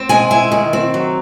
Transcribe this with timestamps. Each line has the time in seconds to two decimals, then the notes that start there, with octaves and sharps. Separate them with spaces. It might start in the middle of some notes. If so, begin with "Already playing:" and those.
Already playing: C4
0.09 G#3 G#5
0.31 E4 G#5
0.52 D#3
0.73 C4
0.94 F#3